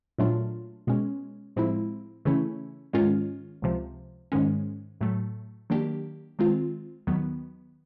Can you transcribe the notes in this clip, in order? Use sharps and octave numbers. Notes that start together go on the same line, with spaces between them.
A#2 F#3 A3 D4 F4
B2 G#3 C#4
A2 F3 G#3 C4 E4
C#3 E3 A3 C#4 E4
G#2 D#3 G#3 C#4 F4
C#2 C3 F3
G#2 D#3 G#3 C#4
A2 F#3 A3
D#3 F#3 A#3 D4 G4
D#3 G#3 C4 F4
D#2 D#3 F#3 B3